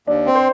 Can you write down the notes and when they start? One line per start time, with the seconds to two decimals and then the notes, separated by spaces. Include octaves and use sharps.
0.07 D#2 D4
0.26 C4
0.35 C5